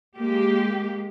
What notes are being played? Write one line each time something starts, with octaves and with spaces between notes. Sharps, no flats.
G#3 A#3 G4